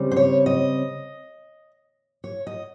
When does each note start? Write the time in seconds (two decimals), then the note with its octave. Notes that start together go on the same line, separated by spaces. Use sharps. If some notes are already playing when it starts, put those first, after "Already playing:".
Already playing: C#3 G3 C4
0.11 C5
0.16 C#5
0.46 D#5
2.24 C#5
2.47 D#5